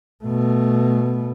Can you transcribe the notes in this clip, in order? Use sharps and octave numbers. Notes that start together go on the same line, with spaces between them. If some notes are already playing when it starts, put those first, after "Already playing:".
B2 A3